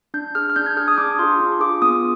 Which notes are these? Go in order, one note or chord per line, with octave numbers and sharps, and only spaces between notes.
D4 G6
G#4 F6
F6
D4 G6
G#6
G#4 F6
D#6
D4 D6
F4 G#4 C6
D4
F4 G#4 D6
B3 D#6